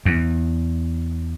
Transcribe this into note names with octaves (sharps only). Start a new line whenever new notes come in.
E2